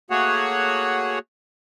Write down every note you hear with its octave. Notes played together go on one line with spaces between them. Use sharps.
A3 A#3 F#4 G#4 C#5 F#5